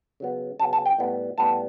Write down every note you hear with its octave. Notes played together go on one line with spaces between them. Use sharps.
C#3 F#3 B3
C#3 F#3 B3 A5
A5
G5
A2 G3 B3
A2 G3 B3 A5